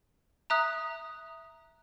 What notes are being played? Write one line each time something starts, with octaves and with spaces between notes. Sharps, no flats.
E5 A#5 D#6 F#6